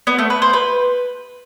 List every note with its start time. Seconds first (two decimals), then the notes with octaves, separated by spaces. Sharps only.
0.07 B3
0.19 A3
0.30 B4
0.42 C5
0.53 B4